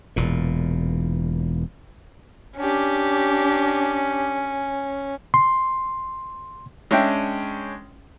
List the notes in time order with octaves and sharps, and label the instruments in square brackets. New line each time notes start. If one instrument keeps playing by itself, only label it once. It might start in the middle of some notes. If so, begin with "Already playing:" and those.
[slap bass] E1 E2 A#2
[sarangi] C#4 [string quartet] D4 G4
[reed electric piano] C6
[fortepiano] G#3 C#4 D4 E5 G5